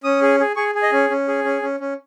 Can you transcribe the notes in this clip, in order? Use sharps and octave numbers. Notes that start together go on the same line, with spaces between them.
C#4 D#6
G#4
G#4
G#4 C#6
G#4
D#5
C#4
C#4
G#4
C#4
C#4
C#4